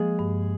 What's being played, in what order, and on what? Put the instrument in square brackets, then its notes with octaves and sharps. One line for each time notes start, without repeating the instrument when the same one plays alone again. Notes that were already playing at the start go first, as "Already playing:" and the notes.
Already playing: [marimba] F3 A#3 [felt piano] G#3 G#4
[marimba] G2